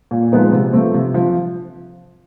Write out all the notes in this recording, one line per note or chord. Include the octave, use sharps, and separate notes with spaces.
A#2
F3 G#3 B3 D#4
C3
F3 A3 C4
C3
F3